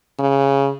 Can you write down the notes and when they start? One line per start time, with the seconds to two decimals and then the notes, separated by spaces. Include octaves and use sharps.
0.19 C#3